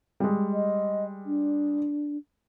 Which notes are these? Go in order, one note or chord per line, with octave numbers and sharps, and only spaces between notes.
G3 G#3
D#5
D4